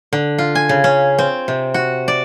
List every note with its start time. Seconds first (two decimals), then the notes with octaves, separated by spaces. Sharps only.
0.13 D3
0.38 F4
0.55 G#5
0.69 C#3
0.84 C#4
1.19 C4
1.48 C3
1.74 F#4
2.08 D5